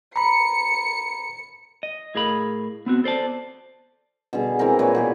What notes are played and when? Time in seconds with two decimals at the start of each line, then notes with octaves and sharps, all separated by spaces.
0.16 A#5 B5 C#7
1.83 D#5
2.15 A2 G#4 A#4 F5 B5
2.86 B3 C4 F#4
3.04 A4 C5 D5 A5
4.33 B2 D3 G3 G#4
4.59 E3 G#3 C4 A#4
4.79 A#2 B4 C#5
4.95 B2 G4 G#4